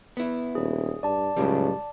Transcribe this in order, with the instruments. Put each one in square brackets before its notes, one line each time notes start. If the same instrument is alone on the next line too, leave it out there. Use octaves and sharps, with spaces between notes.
[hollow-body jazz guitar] B3 E4
[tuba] D#1 [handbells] G#4
[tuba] G2 [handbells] D5 A5
[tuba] C#2 [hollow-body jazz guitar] F#2 A2 G3